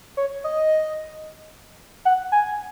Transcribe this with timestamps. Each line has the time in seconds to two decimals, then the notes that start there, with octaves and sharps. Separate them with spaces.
0.17 C#5
0.44 D#5
2.05 F#5
2.32 G#5